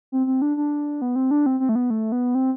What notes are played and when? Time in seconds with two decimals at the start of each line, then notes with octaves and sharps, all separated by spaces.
0.12 C4
0.27 C4
0.42 D4
0.57 D4
1.02 B3
1.16 C4
1.31 D4
1.46 C4
1.60 C4
1.69 A3
1.75 B3
1.90 A3
2.12 B3
2.35 C4